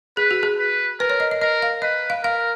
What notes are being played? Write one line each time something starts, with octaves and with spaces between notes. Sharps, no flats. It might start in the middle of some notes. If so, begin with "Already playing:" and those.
G#4 B4
F#4
G#4
B4
A#4 B4
C#5
D#5
D#5
A#4 D#5
F5
B4 D#5
F5
A#4 F5